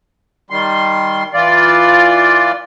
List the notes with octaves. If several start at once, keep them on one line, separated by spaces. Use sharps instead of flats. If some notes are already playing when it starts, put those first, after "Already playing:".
D#3 G3 C6
E3 F4 D5